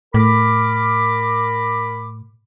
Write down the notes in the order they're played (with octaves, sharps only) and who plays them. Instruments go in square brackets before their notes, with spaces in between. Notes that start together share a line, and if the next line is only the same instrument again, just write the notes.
[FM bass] A2 [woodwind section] A#4 B5 D6